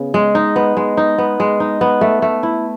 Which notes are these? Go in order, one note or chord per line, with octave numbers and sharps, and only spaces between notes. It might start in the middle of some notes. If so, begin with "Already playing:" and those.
Already playing: C#3 B3
G#3
D#4
B3
G#3
D#4
B3
G#3
D#4
B3
A3
A3
E4